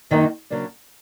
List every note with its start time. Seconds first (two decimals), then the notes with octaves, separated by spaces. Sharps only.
0.11 F#2 D#3 F#3 A#3 D#4
0.50 C#3 F#3 A#3 D4